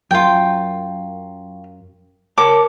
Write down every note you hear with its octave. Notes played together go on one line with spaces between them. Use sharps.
F#2 F#3 F4 G5
A#4 C#5 A5 D6